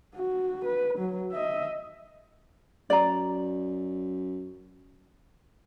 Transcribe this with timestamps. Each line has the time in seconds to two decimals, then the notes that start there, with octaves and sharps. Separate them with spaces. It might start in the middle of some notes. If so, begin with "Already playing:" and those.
0.15 F#4
0.65 B4
0.98 F#3
1.32 D#5 E5
2.90 F#2 D5 A#5